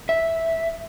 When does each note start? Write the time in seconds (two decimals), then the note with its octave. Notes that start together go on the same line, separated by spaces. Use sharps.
0.09 E5